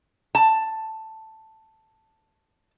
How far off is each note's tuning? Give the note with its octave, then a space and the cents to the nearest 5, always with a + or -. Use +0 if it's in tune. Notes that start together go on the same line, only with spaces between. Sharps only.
A5 +5